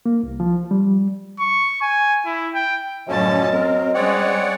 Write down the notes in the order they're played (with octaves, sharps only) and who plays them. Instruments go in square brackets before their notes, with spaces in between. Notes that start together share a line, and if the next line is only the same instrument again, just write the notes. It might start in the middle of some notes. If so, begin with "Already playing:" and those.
[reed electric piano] A#3
C2
F3
G3
[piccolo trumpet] C#6
G#5
E4
G5
[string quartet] F#2 A2 A5 [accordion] D3 F3 C#4 [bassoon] F#3 [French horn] D#5
[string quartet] C4 [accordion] A#4
[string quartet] G3 G#3 C#4 [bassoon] C4 [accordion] C#5 D5 F#5